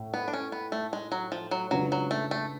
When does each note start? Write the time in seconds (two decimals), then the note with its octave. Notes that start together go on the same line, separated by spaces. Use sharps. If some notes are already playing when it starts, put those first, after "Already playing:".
Already playing: A2
0.14 B3
0.28 D4
0.33 C#4
0.52 B3
0.72 A3
0.93 G#3
1.12 F#3
1.32 F3
1.51 F#3
1.71 C#3 F#3 G#3 D4 F4 B4
1.92 F#3
2.11 A3
2.31 A3